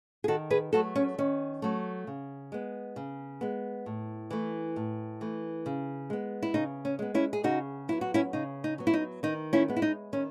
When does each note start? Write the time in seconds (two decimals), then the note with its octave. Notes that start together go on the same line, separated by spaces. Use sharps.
0.24 G#4
0.28 D#3 F#4 A4
0.50 G#4 B4
0.73 F#3 A3 F#4 A4
0.96 C#4
1.18 D#3 C#4
1.62 F#3 A3
2.07 C#3
2.52 G#3 B3
2.96 C#3
3.41 G#3 B3
3.86 A2
4.30 E3 A3
4.76 A2
5.21 E3 A3
5.66 C#3
6.10 G#3 B3
6.43 E4
6.54 C#3 D#4
6.85 C#4
6.99 G#3 B3
7.14 C#4 E4
7.33 G#4
7.44 C#3 D#4 F#4
7.88 F#3 B3 E4
8.01 F#4
8.14 C#4 E4
8.33 C#3 D#4
8.64 D#4
8.78 F#3 B3
8.87 E4
8.94 D#4
9.23 D#3 D#4
9.53 C#4 E4
9.68 G#3 B3
9.76 E4
9.82 D#4
10.13 D#3 C#4